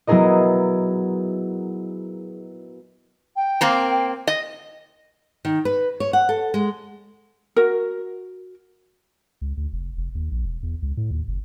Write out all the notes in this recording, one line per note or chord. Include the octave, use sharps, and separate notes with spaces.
F#3 B3 E4 G#4 A#4 D#5
G5
A#3 C4 A#5
D#5
D#3
B4
C#5
F#5
A4
G#3
F#4 A#4
C#2
D2
F1
F1
D#2
A#1
E1
E2
C#2
A2
D#2
F#1